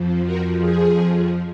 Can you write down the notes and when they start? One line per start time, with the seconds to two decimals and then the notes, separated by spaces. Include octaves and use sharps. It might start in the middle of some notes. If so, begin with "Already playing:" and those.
Already playing: F2 F3
0.25 F#4 A#4
0.59 G#4